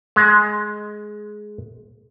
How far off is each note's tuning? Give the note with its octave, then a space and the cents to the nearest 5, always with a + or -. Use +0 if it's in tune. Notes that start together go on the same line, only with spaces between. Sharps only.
G#3 +15